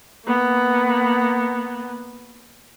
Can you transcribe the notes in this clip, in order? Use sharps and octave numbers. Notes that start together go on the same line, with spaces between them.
A#3 B3